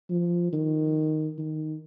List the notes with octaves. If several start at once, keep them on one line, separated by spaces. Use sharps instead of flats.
F3
D#3
D#3